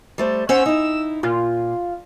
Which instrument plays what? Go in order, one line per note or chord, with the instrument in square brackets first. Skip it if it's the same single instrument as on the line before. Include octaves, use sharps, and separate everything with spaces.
[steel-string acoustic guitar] G3 A3 C5
[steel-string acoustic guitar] C#4 C5 F#5 [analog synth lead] E6
[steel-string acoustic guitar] D#4 E4
[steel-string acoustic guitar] A#2 [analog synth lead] F4